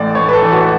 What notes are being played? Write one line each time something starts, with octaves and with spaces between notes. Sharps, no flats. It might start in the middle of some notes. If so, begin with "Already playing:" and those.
Already playing: A1 A2 D5
A1 C#5
B4
A4
E3
F#4